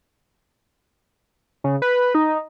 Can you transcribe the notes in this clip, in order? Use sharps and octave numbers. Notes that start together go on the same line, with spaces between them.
C#3
B4
D#4